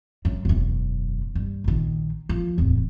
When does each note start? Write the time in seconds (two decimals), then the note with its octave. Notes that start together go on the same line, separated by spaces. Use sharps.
0.25 F#2
0.45 E1 F#2
1.35 G2
1.64 A#1 D#3
2.29 F3
2.58 D1 E2